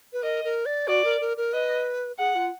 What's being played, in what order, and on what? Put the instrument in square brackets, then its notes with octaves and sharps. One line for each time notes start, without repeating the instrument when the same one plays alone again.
[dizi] B4
[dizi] A#4 [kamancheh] D#5
[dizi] A#4
D5
[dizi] F#4 [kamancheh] D5
[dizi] A#4
A#4
A#4
[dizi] B4 [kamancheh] D#5
[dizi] G#4 [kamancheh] F#5
[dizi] F4